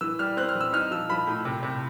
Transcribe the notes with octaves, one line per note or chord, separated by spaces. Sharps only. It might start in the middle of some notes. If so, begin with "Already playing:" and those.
E3 E6
G3 F6
C4 F#6
F6
E3
E6
D#4 F6
F3 E6
F3 B5
A2
C3
C3